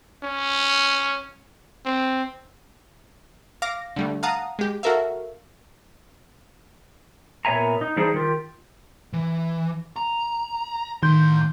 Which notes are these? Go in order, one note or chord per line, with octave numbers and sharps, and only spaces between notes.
C#4
C4
F5 D6 A#6
D3 G3 A3
F5 F#5 A5 A#5 D#6
G#3 G4
F#4 A4 A#4 E5 F5
A#2 B3 C#5 E5 G#5 A#5
D#4
E3 G3 D4 D#4 G#4 C5
D#3 F4 G4
E3
A#5
A2 D#3 C6 G6